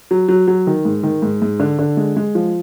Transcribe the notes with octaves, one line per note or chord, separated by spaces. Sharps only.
F#3
F#3
F#3
D#3
G#2
D#3
G#2
G#2
D3
D3
G#3
G#3
F3